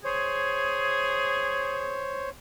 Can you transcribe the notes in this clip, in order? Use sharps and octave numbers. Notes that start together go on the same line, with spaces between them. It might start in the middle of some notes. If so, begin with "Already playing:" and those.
G#4 C5 C#5